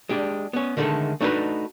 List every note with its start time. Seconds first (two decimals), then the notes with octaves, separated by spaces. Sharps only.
0.09 G#3 D4 G4
0.53 B3 C#4
0.77 D3 D#3 G#3 A3 A4
1.21 A3 D4 D#4 F#4 A#4 B4